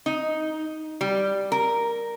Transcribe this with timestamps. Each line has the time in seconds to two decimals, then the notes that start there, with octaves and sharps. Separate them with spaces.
0.06 D#4
1.01 G3
1.52 A#4